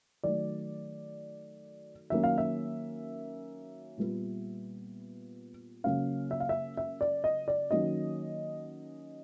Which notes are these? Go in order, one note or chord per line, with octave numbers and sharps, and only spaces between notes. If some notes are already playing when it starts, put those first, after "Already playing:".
D#3 F#3 A3 D5
D#3 F#3 A#3 C#4 E5
F5
E5
A#2 G3 B3
C#3 F#3 A#3 C#4 F5
E5
F5
E5
E5
D5
D#5
D5
D#3 F#3 A#3 C#4 D#5